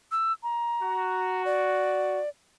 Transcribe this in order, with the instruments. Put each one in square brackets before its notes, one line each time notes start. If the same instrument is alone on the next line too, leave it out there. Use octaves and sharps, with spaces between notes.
[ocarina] E6
A#5
[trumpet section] F#4
[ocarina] D5